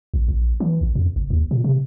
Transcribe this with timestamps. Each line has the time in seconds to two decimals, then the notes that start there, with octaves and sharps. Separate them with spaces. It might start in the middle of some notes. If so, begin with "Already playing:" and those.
0.14 A#1
0.28 A#1
0.60 E3
0.81 A#1
0.95 F2
1.16 F#1
1.30 D#2
1.51 A#2
1.64 C3